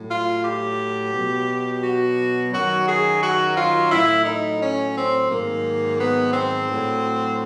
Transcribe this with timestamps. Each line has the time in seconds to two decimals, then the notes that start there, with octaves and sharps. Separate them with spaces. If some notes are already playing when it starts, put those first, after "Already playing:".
Already playing: A2 F#3
0.09 F4
0.44 G4
1.13 B2 F#3
1.83 F#4
2.52 F#2 D#3 F#3 F#4
2.86 G#4
3.22 F#4
3.56 F4
3.91 A2 F#3 E4
4.25 D#4
4.60 C#4
4.95 C4
5.29 G#2 D#3 F#3 A#3
5.98 B3
6.33 C4
6.68 A2 F#3